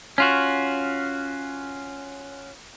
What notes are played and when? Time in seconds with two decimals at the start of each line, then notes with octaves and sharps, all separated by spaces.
0.18 C#4 F4 F#4